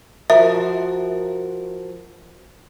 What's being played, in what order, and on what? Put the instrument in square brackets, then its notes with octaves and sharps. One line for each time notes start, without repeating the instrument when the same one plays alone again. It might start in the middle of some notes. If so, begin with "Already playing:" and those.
[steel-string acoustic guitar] F3 F#4 A#4 [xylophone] E5